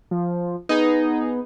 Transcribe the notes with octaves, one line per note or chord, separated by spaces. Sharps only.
F3
B3 D#4 G#4